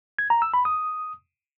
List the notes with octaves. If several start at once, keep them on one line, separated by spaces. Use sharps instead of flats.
G#6
A#5
E6
B5
D#6